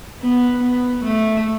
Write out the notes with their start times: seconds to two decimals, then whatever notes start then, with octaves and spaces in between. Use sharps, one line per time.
0.22 B3
0.64 B3
1.05 A3